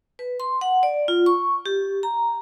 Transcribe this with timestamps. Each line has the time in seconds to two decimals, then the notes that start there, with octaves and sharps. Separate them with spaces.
0.19 B4
0.40 C6
0.61 F#5
0.83 D5
1.08 F4
1.26 C#6
1.66 G4
2.03 A#5